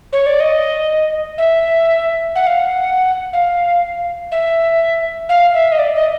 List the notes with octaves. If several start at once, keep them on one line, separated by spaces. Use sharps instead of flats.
C#5
D5
D#5
E5
F#5
F5
F#5
F5
E5
F5
E5
D#5
D5
D#5